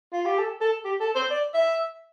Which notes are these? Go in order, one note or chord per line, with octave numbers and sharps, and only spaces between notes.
F4
G4
A4
A4
G4
A4
C5
D5
E5